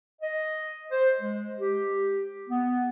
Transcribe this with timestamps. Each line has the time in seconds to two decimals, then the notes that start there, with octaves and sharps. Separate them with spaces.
0.21 D#5
0.90 C5
1.20 G#3
1.58 G4
2.48 B3